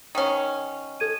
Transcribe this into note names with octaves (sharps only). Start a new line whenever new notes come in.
D#3 C#4
A4 G#6 D#7